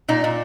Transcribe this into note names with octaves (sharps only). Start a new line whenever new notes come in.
A#2 D#4
A#2